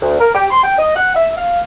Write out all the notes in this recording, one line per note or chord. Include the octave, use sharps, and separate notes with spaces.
D2
A#4
G4
C6
G5
D#5
F#5
E5
F5